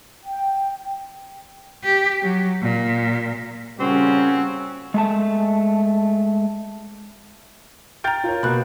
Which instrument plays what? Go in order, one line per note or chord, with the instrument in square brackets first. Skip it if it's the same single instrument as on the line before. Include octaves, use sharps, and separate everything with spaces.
[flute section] G5
[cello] G4
F#3
A#2
[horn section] A#2 C4 F#4 [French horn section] C#3 G3 [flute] C#4
[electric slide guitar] G#3 A3 A5
[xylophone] G5 A#5 [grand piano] F6 G6 A6
[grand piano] F4 A#4 C#5
[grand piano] B2 A#3 [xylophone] B5 F#6